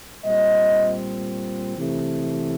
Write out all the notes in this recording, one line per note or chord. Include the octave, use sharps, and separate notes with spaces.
A#2 G3 C4 D#5
C3 E3 A3